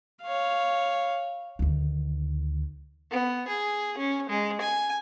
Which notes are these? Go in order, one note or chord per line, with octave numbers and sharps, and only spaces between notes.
C#5 F5
D2 D#3
B3
G#4
C#4
G#3
G#5